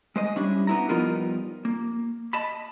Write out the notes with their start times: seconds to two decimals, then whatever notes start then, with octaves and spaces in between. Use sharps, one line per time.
0.16 G#3 C5 D#5
0.36 G3 C#4 D4 E4
0.67 B3 E4 A#5
0.89 F3 G3 B3 D#4 F4 A#4
1.65 A#3
2.33 D#5 A5 B5